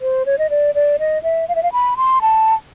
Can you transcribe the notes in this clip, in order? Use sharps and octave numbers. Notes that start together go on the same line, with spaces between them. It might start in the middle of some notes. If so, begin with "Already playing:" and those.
C5
C#5
D#5
D5
D5
D#5
E5
F5
E5
F5
B5
C6
A5